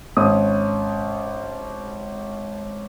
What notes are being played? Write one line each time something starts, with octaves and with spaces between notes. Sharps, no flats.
G#1 C#4 D#6